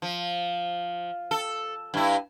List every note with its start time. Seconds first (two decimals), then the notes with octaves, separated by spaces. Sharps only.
0.02 F3
1.31 A4
1.94 G2 E4